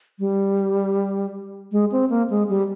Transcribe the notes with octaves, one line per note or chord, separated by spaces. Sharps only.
G3
G#3
C4
A#3
G#3
G3